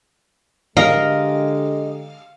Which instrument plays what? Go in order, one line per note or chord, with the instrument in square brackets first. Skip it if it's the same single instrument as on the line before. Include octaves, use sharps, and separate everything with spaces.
[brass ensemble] D3 G#3 G4 [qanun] A#4 [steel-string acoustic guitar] D#5 [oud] F5